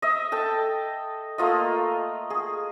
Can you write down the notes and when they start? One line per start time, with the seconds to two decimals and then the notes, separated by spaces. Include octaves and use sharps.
0.02 D#5 E5
0.32 A4 G5 A5
1.38 A3 A#3 F4 D#5
2.30 G#4